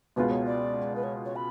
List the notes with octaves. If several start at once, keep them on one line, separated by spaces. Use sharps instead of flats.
C#2 B2 G#3 B3 F4 B4
C#5
D5
B4
C#5
C#5
B5